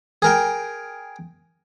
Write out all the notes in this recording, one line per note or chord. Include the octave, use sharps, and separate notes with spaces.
G#4 A#4 G5